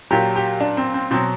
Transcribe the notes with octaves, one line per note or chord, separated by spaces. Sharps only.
A#2 F#3 G4
G4
D4
C4
C4
B2 F#3 C4